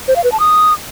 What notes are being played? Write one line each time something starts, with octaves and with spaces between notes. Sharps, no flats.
C5
F5
B4
A5
D#6